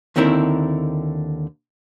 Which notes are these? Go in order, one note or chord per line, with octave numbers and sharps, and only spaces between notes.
D#2 D3 D#3 C4 E4 A#4